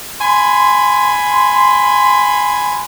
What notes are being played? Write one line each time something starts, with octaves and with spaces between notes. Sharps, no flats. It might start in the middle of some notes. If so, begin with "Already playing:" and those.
G#5 B5 C6